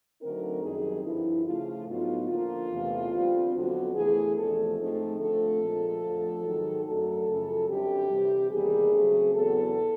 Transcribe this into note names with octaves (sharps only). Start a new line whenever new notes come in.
D3 F#3 A3 C4 D#4 A#4
F#2 D#3 G3 C4 D#4 G#4
G2 D3 F3 E4
C#3 F3 A3 F4
A2 F#3 B3 D#4 F4
D3 F3 A#3 F4
E2 C3 E3 A3
D3 G3 C4
F2 D3 F#3 B3 F#4
E2 C3 E3 A3 G#4
E2 C3 F3 A3 D4 A4
G#2 F3 A3 C4 D#4
D3 F3 A3 C4 A4
A#2 F3 G#3
F2 D3 F3 A3
G#2 D#3 F#3
F#2 D3 F#3 A3 A4
F#2 C#3 F3
F#2 D3 G3 C4 G4
C3 E3 G3
E2 C3 D#3 G3 A#3 G#4
C#3 F#3 A3 C4
E2 C#3 F#3 B3 A4